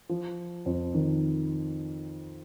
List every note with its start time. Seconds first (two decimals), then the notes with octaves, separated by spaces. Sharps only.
0.09 F3
0.66 F2
0.94 D#3